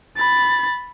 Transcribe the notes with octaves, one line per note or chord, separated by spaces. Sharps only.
B5 A6